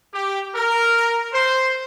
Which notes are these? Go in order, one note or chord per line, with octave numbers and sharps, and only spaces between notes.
G4
A#4
C5